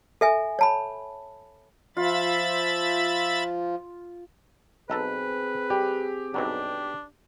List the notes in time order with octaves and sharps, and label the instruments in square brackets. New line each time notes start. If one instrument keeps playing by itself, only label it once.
[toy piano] A4 E5 G#5
C#5 A5 B5
[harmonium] F3 [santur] F4 [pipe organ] E5 B5 A6
[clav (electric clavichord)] B1 A4 A#5 [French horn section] C4 G#4 [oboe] B4
[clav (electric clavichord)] G3 [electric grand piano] G4
[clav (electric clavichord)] B1 G2 F#3 [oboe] D4